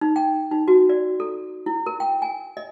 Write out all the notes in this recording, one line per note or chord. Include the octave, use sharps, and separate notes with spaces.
D#4
G5
D#4
F#4
D5
A4
E4
A#4
G5
G#5
D#5